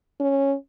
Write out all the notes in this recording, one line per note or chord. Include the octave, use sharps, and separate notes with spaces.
C#4